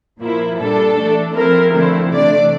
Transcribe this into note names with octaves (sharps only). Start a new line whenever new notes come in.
A#2 F3 A#3 E4
A#2 G3 D4 A4
E3 A3 D4
F3 C4 E4 A#4
D3 F3 A3 C4 E4
C3 E3 A3 D4 D5